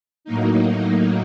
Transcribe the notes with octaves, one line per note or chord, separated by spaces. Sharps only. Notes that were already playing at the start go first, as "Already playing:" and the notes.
A2 F#3 A#3 D#4